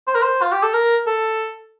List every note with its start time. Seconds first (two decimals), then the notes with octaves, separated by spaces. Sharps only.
0.07 C5
0.15 A#4
0.22 C5
0.42 F4
0.52 G4
0.63 A4
0.73 A#4
1.07 A4